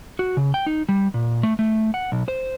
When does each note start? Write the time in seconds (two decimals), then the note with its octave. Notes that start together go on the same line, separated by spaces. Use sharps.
0.19 F#4
0.37 C#3
0.54 G5
0.67 D#4
0.89 G3
1.14 A#2
1.43 A3
1.59 A3
1.94 F#5
2.12 B1
2.28 C5